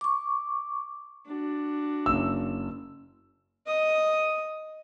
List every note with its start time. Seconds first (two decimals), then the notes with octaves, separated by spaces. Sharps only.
0.01 C#6 D6
1.27 D4 F#4
2.06 F#1 E6
3.67 D#5 D#6